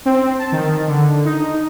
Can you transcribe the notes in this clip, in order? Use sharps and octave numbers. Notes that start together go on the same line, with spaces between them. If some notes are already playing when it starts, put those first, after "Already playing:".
C4
A5
D#3
D3
D#4